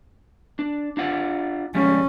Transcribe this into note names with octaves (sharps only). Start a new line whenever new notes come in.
D4
D4 F4 F#5
F3 G3 G#3 C#4